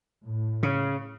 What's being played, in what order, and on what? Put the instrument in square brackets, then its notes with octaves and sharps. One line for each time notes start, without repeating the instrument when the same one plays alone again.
[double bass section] A2
[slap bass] C#3